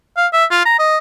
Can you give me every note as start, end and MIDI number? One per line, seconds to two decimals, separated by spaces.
0.17 0.27 77
0.33 0.45 76
0.51 0.60 65
0.65 0.74 82
0.79 0.98 75